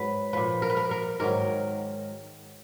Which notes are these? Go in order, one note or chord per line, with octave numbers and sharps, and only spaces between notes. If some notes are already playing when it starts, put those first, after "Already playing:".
Already playing: G#2 F#3 B4
A#2 F3 B4
A#4
B4
A#4
A#4
G#2 D#3 F#3 A#4